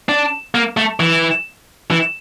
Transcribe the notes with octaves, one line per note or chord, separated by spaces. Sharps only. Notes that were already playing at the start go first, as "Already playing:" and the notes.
D4
A#3
A3
E3
E3